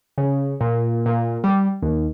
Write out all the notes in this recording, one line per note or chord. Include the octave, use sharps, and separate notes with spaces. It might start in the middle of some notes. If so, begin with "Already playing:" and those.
C#3
A#2
A#2
G3
D#2